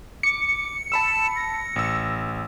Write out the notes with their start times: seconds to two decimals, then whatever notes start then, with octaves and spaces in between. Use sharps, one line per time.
0.23 D6 C#7
0.92 A5 B5 E6 E7
1.36 A#6
1.76 A1 E6